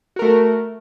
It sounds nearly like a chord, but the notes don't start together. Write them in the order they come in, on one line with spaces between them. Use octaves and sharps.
F#4 A#4 A3